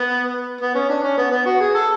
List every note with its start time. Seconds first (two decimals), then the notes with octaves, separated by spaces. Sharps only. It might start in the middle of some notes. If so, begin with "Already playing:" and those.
Already playing: B3
0.61 B3
0.75 C#4
0.89 D4
1.03 C#4
1.17 B3
1.31 B3
1.46 F#4
1.60 G#4
1.75 A4